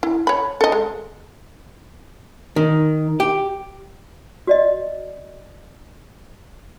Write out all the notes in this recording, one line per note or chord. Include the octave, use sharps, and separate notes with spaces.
E4
C#5 B5
A4 D#5
G#3
D#3
G4
F#4 D5 D#5